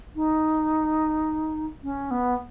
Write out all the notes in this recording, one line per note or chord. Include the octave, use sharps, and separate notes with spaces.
D#4
C#4
B3